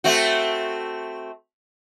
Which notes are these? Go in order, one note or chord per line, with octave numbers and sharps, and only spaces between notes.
A3 C4 F#4